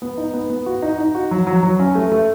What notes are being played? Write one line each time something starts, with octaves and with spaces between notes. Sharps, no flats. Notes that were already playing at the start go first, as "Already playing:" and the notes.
B3
D#4
B3
B3
F#4
D#4
D#4
F#4
F#3
F#3
F#3
C#4
A3
A3